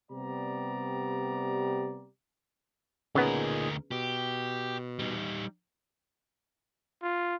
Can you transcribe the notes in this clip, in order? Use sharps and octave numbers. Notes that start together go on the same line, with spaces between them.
C3 G3 B3 G4 D5 A#5
D2 A#2 C#3 B3 D#4 G#4 A#4
B2 G4
G3 D#4
F4